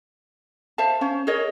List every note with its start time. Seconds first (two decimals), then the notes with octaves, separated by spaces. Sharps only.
0.78 C5 E5 F5 A5
1.01 C#4 C5 F5
1.27 G#4 A#4 C#5 D#5